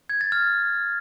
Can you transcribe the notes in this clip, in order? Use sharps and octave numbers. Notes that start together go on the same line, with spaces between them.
G#6
A6
F6